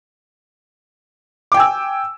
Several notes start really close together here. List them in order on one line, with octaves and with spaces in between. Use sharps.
D6 G5 G#5 E6